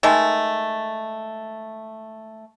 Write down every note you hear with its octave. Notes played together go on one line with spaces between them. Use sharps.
D#3 G#3 A3